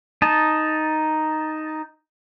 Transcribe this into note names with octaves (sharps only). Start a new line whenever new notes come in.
D#4 A5